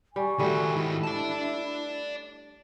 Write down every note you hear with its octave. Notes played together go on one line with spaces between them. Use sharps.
G3 G#5 C#6
D#3 G3 A3 F#4
G#2 D#3 E4
D5 A5